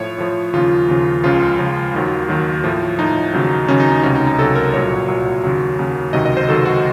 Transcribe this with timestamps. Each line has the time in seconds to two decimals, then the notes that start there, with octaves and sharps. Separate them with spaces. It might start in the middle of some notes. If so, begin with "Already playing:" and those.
Already playing: A2 F3 C#5
0.18 A2 F3
0.53 D#2 C#3 F3 F4
0.88 D#2 C#3 F3
1.24 C#2 C#3 F3 F4
1.59 C#2 C#3 F3
1.93 D#2 D#3 F#3
2.29 D#2 D#3 F#3
2.64 A2 F3
2.98 A2 F3 D#4
3.34 D#2 C#3 F#3
3.68 D#2 C#3 F#3 C#4
3.80 D#4
3.92 D#4
4.03 C#2 C3 F#3 C#4
4.15 D#4
4.27 D#4
4.38 C#2 C3 F#3 A4
4.55 A#4
4.73 C2 A#2 F#3 C#5
5.08 C2 A#2 F#3
5.43 D#2 C#3 F#3
5.79 D#2 C#3 F#3
6.13 C#2 C3 D#3 F#3 D#5
6.26 D#5
6.37 C5
6.48 C#2 C3 D#3 F#3 A4
6.65 F#4